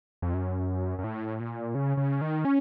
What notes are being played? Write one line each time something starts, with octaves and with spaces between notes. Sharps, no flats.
F2
F#2
F#2
A2
A#2
C#3
C#3
D#3
C#4